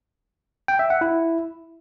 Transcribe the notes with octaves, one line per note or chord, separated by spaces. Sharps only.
G5
E5
F#5
E4